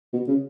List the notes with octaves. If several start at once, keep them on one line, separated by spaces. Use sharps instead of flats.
B2
C#3